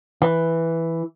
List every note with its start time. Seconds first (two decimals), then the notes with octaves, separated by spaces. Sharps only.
0.22 E3